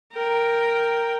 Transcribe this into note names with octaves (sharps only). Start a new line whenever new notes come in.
A#4 G5